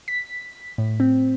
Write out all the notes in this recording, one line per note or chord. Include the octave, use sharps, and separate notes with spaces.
B6
A2
C4